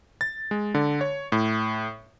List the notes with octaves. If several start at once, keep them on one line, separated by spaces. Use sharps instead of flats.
A6
G#3
D3
C#5
A2